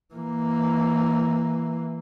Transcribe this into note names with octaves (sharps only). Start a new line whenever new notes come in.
E3 A#3